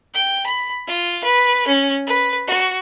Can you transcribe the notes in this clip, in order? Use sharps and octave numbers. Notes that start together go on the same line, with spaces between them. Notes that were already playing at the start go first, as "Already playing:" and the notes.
G5
B5
F4
B4
C#4
B4
F#4